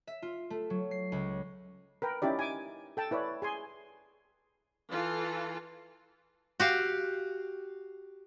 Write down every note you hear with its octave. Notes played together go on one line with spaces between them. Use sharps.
E5
F4
A3
F#3
C7
C#2
A#4 B4 G5
C#4 D#4 E4 G4 D5
G#5 D6
A4 G5 A5
E4 B4 C#5 D5
G#4 G#5 C6
E3 F4 A4
F#4 G4 F5